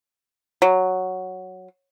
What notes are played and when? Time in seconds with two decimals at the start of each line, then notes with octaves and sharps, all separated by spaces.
0.62 F#3